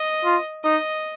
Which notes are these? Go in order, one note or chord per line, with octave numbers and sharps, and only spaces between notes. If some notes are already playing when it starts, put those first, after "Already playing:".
Already playing: D#5
F4
D#4 D#5